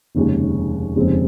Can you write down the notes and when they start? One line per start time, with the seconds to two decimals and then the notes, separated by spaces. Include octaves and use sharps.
0.15 F1 D#2 C#3 G#3
0.96 F1 D#2 C#3 G#3 C4